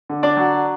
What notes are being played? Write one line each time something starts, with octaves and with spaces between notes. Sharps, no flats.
D3
D4 D5
F#3